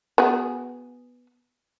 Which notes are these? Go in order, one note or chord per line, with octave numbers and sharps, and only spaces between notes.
B3 F#4 G#4